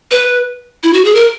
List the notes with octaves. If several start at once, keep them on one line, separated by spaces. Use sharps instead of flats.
B4
E4
F#4
G#4
A#4